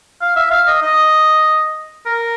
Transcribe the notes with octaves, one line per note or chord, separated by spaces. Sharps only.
F5
E5
F5
D#5
D#5
A#4